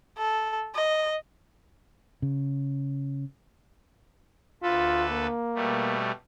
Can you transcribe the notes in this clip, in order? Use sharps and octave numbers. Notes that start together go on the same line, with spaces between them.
A4
D#5
C#3
D2 F4 A4 B4
A#3
B2 G3 A3